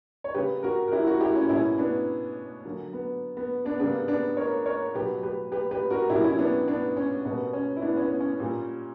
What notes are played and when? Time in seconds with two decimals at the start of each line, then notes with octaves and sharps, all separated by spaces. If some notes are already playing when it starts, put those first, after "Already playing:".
0.24 C#5
0.34 C#3 G3 A#3 G4 B4
0.63 F#4 A#4
0.88 A#4
0.92 E4 G4
1.07 F#4 A#4
1.20 E4 G4
1.35 C#4
1.49 B2 G3 A#3 C#4 E4
1.78 B3 D4
2.65 D3 F#3 A#3
2.93 B3
3.37 B3
3.65 B3 D4
3.79 C#3 G3 A#3 B3 D4
4.08 B3 D4
4.37 A#4 C#5
4.66 A#4 C#5
4.95 B2 F#3 A#3 G4 B4
5.23 G4 B4
5.52 G4 B4
5.71 G4 B4
5.90 F#4 A#4
6.09 B2 F#3 A#3 E4 G4
6.24 C#4 E4
6.39 B3 D4
6.68 B3 D4
6.97 C#4
7.25 B2 G3 A#3 B3
7.53 C#4
7.77 E4
7.82 B3 D4
7.96 C#4
8.02 B3
8.20 C#4
8.39 A#2 G3 A#3